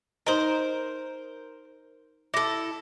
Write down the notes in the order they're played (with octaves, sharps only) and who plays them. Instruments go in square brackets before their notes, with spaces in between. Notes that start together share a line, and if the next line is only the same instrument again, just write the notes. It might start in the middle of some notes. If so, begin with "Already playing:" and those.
[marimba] D#4 D#5 [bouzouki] A#4 C5
[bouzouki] E4 A4 [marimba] D6 A#6